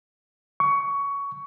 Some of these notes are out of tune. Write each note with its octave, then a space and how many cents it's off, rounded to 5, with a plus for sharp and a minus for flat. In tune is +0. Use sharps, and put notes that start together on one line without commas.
C#6 +15